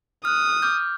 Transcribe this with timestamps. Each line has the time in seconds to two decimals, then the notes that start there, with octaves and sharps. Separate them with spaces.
0.25 D#6 F6 F#6
0.62 D6 F6 G6